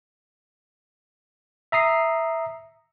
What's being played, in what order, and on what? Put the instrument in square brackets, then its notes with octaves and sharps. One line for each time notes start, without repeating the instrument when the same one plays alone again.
[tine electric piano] E5 A#5 D#6 C7